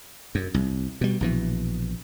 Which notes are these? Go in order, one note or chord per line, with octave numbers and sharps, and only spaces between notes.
F#2
C2
B2 G3
A#1 B2 E3